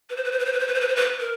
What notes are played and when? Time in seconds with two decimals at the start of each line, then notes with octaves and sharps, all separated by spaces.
0.10 B4
0.16 C5
0.24 B4
0.32 C5
0.39 B4
0.45 C5
0.53 B4
0.60 C5
0.68 B4
0.74 C5
0.81 B4
0.88 C5
0.96 B4
1.20 A#4